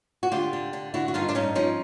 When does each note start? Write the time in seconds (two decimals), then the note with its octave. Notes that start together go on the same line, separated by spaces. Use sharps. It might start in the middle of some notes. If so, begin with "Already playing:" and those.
0.23 F#4
0.32 D3 F4 G4
0.53 D3
0.73 D3
0.94 D3 E4 F#4
1.08 F#4
1.14 G2 D#4 F4
1.28 D4
1.35 G2 C#4 D#4
1.55 F3 C#4 D#4